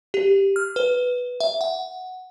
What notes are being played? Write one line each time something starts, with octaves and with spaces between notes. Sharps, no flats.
G4
F6
B4
E5
F#5